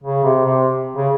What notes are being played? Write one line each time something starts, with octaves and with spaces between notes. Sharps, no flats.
C#3
C3
C3
C#3